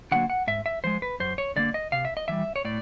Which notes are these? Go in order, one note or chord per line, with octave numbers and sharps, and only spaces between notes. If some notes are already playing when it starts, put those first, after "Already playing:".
D3 F#3 A#3 F#5
F#5
G#2 E5
E5
F3 G#3 C5
B4
F#2 C5
C#5
D3 G3 A#3 D5
D#5
C3 F5
E5
D#5
E3 G3 E5
C#5
A2 D5